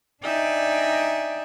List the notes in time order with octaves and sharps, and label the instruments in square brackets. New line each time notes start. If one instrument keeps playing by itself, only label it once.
[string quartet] D4 D#4 D5 E5 G5 G#5